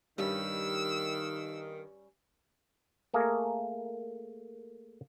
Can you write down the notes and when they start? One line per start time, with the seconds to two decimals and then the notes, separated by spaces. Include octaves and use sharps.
0.18 G2 D#3 G3 C#4 E6
3.14 A3 A#3 G#4 A#4